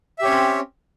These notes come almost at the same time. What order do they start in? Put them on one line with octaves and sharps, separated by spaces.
E5 G4 C#5 C#4 C4